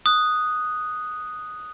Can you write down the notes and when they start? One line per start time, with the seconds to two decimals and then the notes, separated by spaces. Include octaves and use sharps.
0.06 D#6 F#6